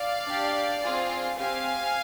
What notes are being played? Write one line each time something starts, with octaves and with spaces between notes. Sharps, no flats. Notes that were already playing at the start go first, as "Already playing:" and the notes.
Already playing: D5 F5
D4 G4
C4 F4 G#4
C4 G4 F5 G#5